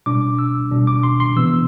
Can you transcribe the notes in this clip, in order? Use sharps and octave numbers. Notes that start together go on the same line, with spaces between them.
B2 G3 D4 D6
E6
B2 G3 D4
D6
C6
C6
C3 E3 B3 E6